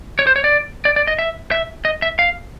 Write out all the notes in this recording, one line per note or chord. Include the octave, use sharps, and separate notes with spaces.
C#5
C5
C#5
D5
D5
D5
D#5
E5
E5
D#5
E5
F5